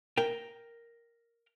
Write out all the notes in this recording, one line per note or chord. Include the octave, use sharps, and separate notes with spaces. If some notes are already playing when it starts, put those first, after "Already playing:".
A#4 G5